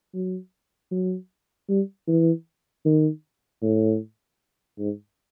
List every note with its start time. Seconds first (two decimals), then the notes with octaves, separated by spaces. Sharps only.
0.14 F#3
0.91 F#3
1.69 G3
2.08 E3
2.85 D#3
3.62 A2
4.79 G#2